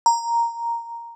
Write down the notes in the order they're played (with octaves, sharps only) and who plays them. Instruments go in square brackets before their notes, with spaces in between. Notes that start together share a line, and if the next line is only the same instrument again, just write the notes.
[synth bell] A#5